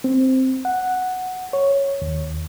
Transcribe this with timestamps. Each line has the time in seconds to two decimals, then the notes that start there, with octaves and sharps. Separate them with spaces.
0.04 C4
0.65 F#5
1.53 C#5
2.02 D#2